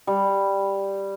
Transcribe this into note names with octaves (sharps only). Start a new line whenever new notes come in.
G3